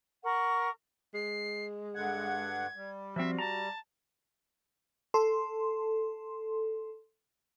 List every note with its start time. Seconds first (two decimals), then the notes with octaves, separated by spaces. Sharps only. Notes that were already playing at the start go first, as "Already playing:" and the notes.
0.24 A#4 F#5 C#6
1.14 G#3 C7
1.95 G2 D3 F#5 G#6
2.76 G3
3.16 F3 C4 F#4 E5
3.39 A5 A#5
5.14 A4 C6